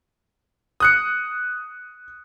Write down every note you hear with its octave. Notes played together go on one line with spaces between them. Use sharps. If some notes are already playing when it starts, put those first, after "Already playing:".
D#6 F#6 C#7